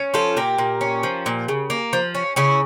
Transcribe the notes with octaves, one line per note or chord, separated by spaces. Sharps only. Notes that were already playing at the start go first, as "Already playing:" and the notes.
Already playing: C#4
F3 F4 A4
A#2 G4 A#4
A#2
C#4
F3
A#2
C#3
A#3
F3
C#4
C#3 C#4 E4